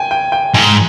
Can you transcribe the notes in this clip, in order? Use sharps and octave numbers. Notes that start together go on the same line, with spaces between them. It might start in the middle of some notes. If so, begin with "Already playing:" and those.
Already playing: G5 G#5
G5
G5
G#2 G#5